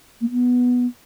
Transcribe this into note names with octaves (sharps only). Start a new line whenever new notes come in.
A#3
B3